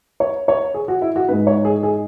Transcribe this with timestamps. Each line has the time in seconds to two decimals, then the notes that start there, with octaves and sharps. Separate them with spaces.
0.20 C#5
0.48 C#5
0.74 G#4
0.88 F#4
1.02 E4
1.16 F#4
1.28 G#2 G#3 B4
1.47 C#5
1.65 G#4
1.83 G#4